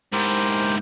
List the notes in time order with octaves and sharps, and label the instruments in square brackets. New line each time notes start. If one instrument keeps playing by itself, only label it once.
[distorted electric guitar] G#2 E4 [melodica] G4 A#4 C5